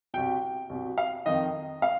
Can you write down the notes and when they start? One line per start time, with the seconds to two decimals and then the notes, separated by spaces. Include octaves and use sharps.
0.14 C2 B2 G5
0.69 C2 B2
0.98 F5
1.26 F2 D#3 D#5
1.82 F5